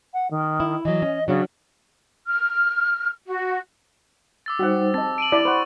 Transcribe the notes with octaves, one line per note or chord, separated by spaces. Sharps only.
F#5
D#3
E4
E3 F#3 D#5
C#4
C#3 F#3 D4 F#4
F6
F#4
D6 E6 A6
G3 D#4 F#4 C5 F#5
C4 D#5 A5 A6
D7 D#7 F#7
E4 D5
C5 F#5 B5 C#6